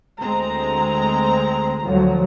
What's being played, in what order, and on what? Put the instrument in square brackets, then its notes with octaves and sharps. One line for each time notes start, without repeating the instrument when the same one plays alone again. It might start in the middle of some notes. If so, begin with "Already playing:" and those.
[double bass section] D2 [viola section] G#3 C4 A#5
[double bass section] D2 F3 F#3